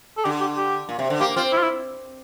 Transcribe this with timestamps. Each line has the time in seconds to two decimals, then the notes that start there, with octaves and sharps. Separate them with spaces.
0.18 A4
0.25 D3 G4
0.41 G4
0.57 G4
0.89 A#2
0.99 C3
1.10 D3
1.20 A#3 G4
1.37 C4 F4
1.53 E4
1.58 F4
1.63 E4